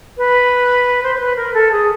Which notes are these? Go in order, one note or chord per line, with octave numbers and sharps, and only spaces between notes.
B4
C5
C5
B4
A#4
A4
G#4